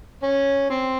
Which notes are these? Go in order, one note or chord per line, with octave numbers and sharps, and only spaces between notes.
C#4
C4